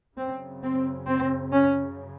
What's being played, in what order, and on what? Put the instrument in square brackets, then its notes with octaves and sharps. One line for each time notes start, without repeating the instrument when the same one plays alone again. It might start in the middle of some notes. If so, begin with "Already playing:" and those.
[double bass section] F#2 C#3 C4
C4
C4
C#4